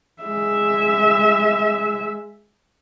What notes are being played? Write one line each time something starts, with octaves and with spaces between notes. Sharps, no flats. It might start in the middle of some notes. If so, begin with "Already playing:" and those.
G#3 E5